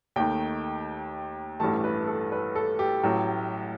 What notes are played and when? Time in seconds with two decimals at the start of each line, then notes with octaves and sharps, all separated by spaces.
0.16 D#2 D#3 A3 G5
1.60 A1 G2 E3 A3 A5
1.84 B4
2.07 A4
2.32 B4
2.55 A4
2.79 G4
3.03 A1 A2 F#3